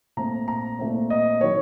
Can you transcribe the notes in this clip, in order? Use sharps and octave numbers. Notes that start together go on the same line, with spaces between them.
A#2 A3 C4 A#5
A#5
A#2 A3 C4
D#5
D#3 F#3 C#5